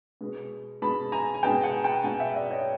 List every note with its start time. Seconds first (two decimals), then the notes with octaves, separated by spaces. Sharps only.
0.21 B2 G#3 B3
0.82 B2 G#3 B3 A5 B5
1.12 G#5 A#5
1.34 G#5
1.43 B2 G#3 B3 G5 A5
1.63 F#5 G#5
1.84 G5 A5
2.04 B2 G#3 B3 F#5 G#5
2.20 E5 F#5
2.35 D5 E5
2.50 C#5 D#5